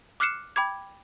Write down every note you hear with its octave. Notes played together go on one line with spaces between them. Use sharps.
D6 F6 F#6 C7 C#7 E7
G5 B5 D6 G#6